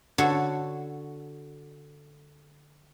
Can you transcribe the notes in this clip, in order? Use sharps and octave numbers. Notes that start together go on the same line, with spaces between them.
D3 F#4 A4 C#5